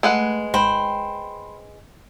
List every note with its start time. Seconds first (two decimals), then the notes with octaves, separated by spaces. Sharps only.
0.03 G#3 A3 B4 F#5
0.54 G#1 C5 G5 B5